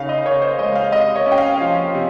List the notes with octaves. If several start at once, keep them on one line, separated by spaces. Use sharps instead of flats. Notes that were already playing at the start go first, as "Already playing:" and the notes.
Already playing: C#3 D#4 F5
D#5
C#3 C#5
C5
G#3 D#5
F5
C3 D#5
C#5
C#4
G5
F5
F3
C3